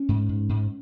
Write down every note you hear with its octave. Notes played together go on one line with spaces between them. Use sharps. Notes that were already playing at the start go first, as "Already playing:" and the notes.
Already playing: C#4
G#2
G#2
G#2